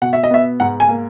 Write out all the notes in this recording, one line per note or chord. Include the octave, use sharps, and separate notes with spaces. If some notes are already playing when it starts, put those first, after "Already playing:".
B2 F#5
E5
D#5
B3 E5
G#2 F#5
G#5
A#3